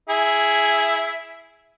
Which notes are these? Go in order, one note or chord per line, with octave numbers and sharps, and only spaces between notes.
E4 G#4